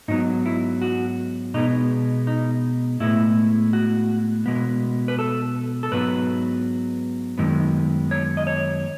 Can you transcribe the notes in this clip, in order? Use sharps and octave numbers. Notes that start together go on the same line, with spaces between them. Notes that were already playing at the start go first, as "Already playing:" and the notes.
G#2 F#3 B3 D#4
E4
F#4
B2 G#3 B3 D#4
D#4
A2 G#3 B3 E4
F#4
B2 G#3 B3
B4
A4
A4
G#2 F#3 B3 B4
F#2 D#3 G#3 B3
C#5
D#5
C#5